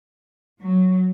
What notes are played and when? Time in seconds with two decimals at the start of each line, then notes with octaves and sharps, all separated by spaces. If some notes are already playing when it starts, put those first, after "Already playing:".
0.62 F#3